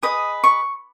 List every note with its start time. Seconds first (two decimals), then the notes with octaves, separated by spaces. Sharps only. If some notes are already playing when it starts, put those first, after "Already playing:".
0.03 G#4 B4 D#5 D#6
0.44 C#6